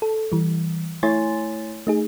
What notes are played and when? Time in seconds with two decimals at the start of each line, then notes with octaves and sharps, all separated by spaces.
0.02 A4
0.32 E3 G3
1.03 A3 E4 C#5 G#5 C6 A6
1.87 A3 D#4 G#4